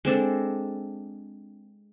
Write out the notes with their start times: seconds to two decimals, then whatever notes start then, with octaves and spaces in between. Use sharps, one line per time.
0.05 G#3 C4 D4 A4